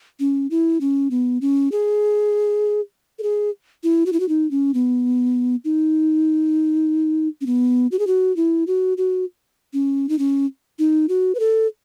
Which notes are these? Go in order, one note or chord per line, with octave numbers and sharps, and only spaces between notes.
C#4
E4
C#4
B3
C#4
G#4
A4
G#4
E4
F#4
E4
F#4
D#4
C#4
B3
D#4
C#4
B3
F#4
G#4
F#4
E4
F#4
F#4
C#4
D#4
C#4
D#4
F#4
B4
A4